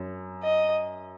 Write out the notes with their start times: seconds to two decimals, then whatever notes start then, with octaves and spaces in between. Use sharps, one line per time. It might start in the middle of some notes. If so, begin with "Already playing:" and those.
Already playing: F#2
0.43 D#5